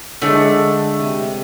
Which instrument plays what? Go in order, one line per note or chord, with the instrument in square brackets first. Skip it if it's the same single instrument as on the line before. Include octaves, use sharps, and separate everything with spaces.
[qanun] D3 G#3 D4 [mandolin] A3
[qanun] C3